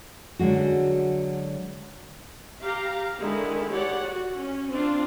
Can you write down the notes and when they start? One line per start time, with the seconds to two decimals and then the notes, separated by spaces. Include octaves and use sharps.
0.39 D3 F#3 G#3 F#4
2.61 G4 F5 A#5
3.19 D3 D#3 G#3 E4
3.72 G4 C#5 D5 F#5
4.03 F#4
4.37 C#4
4.70 C4 D4 F4